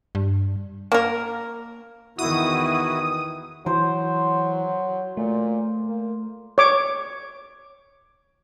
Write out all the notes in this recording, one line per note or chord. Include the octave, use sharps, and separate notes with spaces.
G2
A#3 A#4
E2 D#3 E4 F#4 D#6
E3 F#3 C5
A#2 A3
A#3
C#5 D6